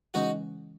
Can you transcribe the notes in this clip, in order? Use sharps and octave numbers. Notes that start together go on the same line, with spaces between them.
C#3 E3 G#3 C#4 D#4 F#4